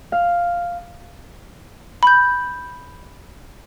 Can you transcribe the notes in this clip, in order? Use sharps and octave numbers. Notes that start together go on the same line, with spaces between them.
F5
B5 G6